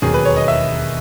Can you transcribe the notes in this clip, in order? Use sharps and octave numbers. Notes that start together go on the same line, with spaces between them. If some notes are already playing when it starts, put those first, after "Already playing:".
E1 D#2 D#3 F#3 G#4
B4
C#5
D#5
E5